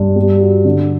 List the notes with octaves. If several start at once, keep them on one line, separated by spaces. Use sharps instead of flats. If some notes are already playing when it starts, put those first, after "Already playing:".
Already playing: G2
G3
F#4
D3